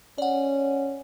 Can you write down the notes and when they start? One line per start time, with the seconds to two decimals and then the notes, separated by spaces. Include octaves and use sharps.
0.18 C#4 D5 F#5